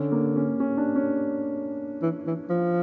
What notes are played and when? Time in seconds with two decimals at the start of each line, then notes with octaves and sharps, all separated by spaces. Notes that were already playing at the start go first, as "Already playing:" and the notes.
Already playing: D3 C#4
0.12 A#3
0.36 C#4
0.60 C#4
0.77 D4
0.96 C#4
2.02 E3
2.27 E3
2.50 F3